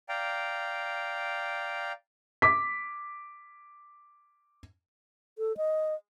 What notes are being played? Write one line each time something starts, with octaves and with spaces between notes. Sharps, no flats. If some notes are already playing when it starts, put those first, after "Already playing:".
D5 F5 G5 A#5
D6 B6
A4
D#5